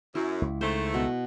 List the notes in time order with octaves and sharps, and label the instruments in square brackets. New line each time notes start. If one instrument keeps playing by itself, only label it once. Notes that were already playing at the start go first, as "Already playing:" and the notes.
[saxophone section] F#2 [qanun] E4
[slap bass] C#2
[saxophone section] G#2 D#3 A3 [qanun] C5
[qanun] B2